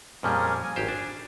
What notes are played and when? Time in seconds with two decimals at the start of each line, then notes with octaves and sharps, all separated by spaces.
0.23 F2 A#2 G3 C#4 G#4 A#4
0.63 G#5
0.76 G#1 G4 C5
0.88 D4